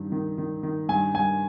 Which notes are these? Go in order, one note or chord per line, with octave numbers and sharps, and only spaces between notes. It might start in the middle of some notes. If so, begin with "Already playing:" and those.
Already playing: G2 D#3
D#3
D#3
D#3
G2 G#5
G2 G#5